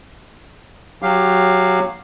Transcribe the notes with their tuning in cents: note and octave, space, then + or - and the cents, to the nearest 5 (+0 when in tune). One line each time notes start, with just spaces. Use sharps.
F#3 +0 G4 +15 F5 +0